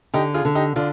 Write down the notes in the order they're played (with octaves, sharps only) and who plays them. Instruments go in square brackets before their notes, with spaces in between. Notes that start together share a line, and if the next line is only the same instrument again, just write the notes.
[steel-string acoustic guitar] D3 [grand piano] D#4 G4
[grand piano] F4 G#4
[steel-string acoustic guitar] D3
[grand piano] D#4 G4
[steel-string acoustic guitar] D3 [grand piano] D4 F4